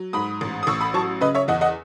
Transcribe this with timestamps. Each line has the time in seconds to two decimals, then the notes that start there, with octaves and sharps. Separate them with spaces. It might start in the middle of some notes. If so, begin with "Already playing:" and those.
Already playing: F#3
0.13 G#2 B5 D#6
0.41 A1
0.63 D#6
0.67 A1 C#6 E6
0.81 B5 D#6
0.94 F#3 A5 C#6
1.21 C#3 B4 D#5
1.35 C#5 E5
1.48 E2 D#5 F#5
1.61 D#5 F#5